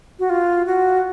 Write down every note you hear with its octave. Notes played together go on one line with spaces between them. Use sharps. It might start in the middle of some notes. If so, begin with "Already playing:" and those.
F#4
F4
F#4